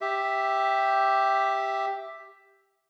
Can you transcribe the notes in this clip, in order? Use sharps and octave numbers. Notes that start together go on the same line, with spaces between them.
G4 E5